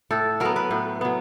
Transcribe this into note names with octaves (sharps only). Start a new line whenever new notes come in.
A2 A4
F#3 B3 A#4
B4
A2
F#3 B3